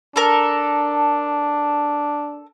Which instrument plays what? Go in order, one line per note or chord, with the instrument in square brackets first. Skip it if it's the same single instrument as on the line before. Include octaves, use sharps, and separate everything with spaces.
[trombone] D4 [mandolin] A4 A#4